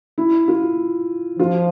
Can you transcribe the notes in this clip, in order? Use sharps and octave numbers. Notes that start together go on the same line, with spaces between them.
E4
F4
F3 F4